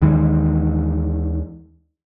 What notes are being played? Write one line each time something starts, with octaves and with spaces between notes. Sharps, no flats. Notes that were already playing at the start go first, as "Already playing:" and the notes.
D#2 D#3 E3 G#3